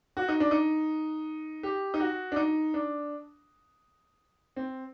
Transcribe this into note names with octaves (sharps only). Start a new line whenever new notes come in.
F#4
D#4
D4
D#4
G4
D#4
F#4
D4
D#4
D4
C4